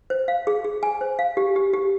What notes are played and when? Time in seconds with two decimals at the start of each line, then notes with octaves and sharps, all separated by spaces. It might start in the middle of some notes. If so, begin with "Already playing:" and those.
0.10 C5
0.28 F5
0.47 G#4
0.64 G#4
0.83 G#5
1.01 C5
1.19 F5
1.37 G4
1.56 G4
1.73 G4